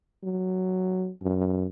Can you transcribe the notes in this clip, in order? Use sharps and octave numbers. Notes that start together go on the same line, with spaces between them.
F#3
F#2